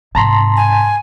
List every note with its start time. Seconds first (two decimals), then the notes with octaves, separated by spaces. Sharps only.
0.15 G#2 C3 A5 A#5 C6
0.56 G#5